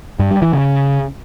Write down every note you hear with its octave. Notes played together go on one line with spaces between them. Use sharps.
G2
G3
E3
C#3